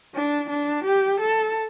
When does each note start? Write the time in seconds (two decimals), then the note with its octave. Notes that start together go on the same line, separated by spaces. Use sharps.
0.15 D4
0.49 D4
0.84 G4
1.19 A4